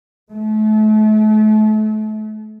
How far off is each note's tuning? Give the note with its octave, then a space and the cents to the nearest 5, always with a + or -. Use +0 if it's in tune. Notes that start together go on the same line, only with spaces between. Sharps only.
A3 -35